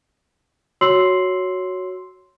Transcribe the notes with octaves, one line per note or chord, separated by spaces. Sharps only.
F#4 C#5 C6 E6 C7 F#7